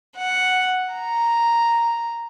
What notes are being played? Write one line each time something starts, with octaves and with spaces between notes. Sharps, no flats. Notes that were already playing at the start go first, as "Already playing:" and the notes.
F#5
A#5